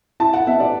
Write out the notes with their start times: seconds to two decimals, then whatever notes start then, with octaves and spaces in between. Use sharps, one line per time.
0.20 E4 A5
0.34 F#5
0.47 B3 E5
0.60 D5